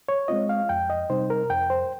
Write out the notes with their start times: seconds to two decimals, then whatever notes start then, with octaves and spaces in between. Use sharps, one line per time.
0.09 C#5
0.28 G#3 C4 F4 D#5
0.49 F5
0.69 F2 G5
0.90 D#5
1.10 C3 G3 C4 D#4 C5
1.30 A#4
1.50 F2 G5
1.70 C5